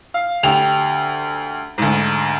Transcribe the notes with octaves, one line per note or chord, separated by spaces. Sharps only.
F5
D2 G4 F7
D2 G#2